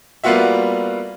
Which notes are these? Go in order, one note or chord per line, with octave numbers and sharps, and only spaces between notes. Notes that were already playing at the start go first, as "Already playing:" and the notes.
G3 A#3 B3 F4 F#4 E5